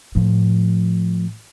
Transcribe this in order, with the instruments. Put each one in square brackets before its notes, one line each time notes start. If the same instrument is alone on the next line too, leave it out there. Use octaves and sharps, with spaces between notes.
[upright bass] A2 F3